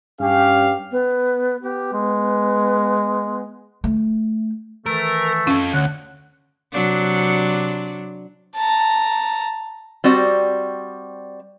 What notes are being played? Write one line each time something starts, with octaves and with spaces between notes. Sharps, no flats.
G2 C#4 G4 F5
B3
B3 G4
G#3
A3
D#3 E3 A3 A#4
C#4 F4 A4
D2 C#5 F#5
C3 F#3 D4
A5 A#5
G3 C4 F#4 D5